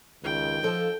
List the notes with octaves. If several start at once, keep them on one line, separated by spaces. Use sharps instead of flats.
C#2 D#3 G5
F3 D#4 A4